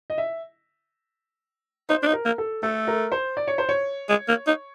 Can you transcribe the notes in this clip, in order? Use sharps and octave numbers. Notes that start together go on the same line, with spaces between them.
D#5
E5
D#4 C5
D4
D#4
A#4
A#3
A4
A3 A4
A#4
C5
D5
C#5
C5
C#5
G#3
A#3
D#4